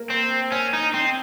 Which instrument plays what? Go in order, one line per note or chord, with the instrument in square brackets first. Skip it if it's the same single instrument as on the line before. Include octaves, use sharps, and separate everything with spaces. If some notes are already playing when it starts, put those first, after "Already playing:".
Already playing: [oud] A#3
[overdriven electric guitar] C4
C#4
D#4
C4